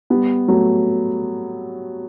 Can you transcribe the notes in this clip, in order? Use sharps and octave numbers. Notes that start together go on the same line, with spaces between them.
G3 B3
F#3 A3